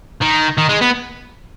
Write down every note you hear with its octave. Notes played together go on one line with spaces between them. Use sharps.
D#3
D#3
G#3
B3